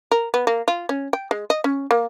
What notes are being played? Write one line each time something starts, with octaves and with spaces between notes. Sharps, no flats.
A#4
B3
A#3
F4
C#4
G5
G#3
D#5
C#4
A#3